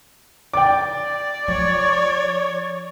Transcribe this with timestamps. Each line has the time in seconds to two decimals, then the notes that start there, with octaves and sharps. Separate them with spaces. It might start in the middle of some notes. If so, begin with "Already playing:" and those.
0.54 D5 G5 D6
1.48 F3 C#5